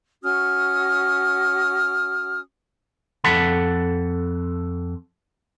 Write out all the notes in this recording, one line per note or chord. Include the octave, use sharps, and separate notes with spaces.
C#4 F#4 D#6 F6
F2 A4 F#5 A5 B5